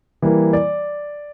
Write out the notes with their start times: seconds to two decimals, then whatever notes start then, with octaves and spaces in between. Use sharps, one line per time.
0.22 E3 G3 A#3
0.53 D5